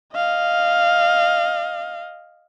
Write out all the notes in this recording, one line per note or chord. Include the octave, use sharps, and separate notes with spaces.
D#5 F5